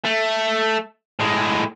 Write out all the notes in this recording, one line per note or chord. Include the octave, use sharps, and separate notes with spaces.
A3
A2 G#3